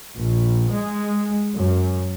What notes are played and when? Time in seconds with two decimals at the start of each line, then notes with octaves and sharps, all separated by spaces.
0.17 A#1
0.70 G#3
1.55 F#2